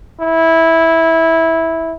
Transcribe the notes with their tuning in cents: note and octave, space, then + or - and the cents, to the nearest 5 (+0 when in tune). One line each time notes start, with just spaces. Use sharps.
E4 -10